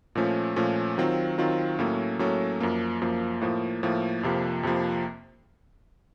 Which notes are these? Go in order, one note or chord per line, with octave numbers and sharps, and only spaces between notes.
A#2 F3 A3 C#4
A#2 F3 A3 C#4
D#3 F#3 C4 F4
D#3 F#3 C4 F4
A2 F#3 A#3 C#4 A4
A2 F#3 A#3 C#4 A4
F#2 F3 A#3
F#2 F3 A#3
A2 F3 A#3
A2 F3 A#3
F2 C3 F3 A#3
F2 C3 F3 A#3